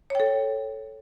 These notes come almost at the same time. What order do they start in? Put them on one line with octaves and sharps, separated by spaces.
C#5 G5 A4